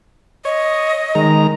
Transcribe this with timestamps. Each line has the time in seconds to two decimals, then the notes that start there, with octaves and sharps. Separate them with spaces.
0.45 C#5 D#5
1.15 D#3 G#3 A#5